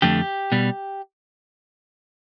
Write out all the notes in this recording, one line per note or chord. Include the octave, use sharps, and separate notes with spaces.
F2 D3 A3 G4
B2 G3